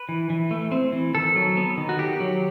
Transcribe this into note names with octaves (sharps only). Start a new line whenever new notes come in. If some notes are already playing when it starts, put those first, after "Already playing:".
Already playing: B4
E3
E3
A3
C4
E3
D#3 A4
F#3
B3
D#3
F#4
D#3 G4
F#3